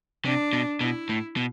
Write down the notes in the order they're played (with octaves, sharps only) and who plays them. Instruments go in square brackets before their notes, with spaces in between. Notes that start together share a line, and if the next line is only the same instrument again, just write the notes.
[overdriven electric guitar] C3 [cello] D4
[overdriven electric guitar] B2
[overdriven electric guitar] B2 [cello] E4
[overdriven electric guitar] A2
B2